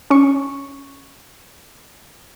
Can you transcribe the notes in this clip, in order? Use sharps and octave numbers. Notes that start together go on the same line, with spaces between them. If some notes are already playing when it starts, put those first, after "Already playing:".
C#4 C#6